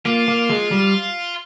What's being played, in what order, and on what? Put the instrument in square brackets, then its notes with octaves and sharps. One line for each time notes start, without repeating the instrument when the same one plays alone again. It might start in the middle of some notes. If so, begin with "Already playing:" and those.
[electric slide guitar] A#3 [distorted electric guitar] F4
[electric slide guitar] A#3
G#3
G3